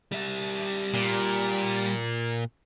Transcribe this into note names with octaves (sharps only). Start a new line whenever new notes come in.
G3 E5
A#2